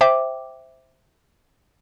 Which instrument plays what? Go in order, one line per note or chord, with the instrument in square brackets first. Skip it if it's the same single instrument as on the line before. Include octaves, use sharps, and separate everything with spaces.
[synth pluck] C5 E5 G5 D6